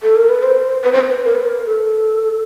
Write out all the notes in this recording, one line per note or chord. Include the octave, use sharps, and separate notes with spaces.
A4
A#4
B4
C5
B4
C5
B4
A#4
B4
A#4
A4